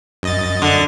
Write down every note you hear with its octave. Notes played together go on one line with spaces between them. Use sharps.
F#2 D#5 A6
D3